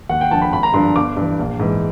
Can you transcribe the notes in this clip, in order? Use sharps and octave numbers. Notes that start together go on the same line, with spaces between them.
D#2 F#5
G5
D3 F3 A5
B5
G#1 B5
A#5
G2 D3 F3 C6
G1 D6
G2 E3
A#1
G#2 E3